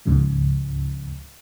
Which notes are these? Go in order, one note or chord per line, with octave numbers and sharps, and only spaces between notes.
C#2 G#2 C#3 F3